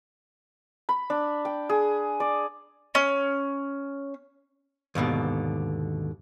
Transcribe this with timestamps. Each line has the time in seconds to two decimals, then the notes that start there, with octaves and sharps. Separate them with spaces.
0.89 B5
1.10 D4
1.45 G5
1.69 G#4
2.20 D5
2.95 C#4
4.95 D#2 G#2 B2 D3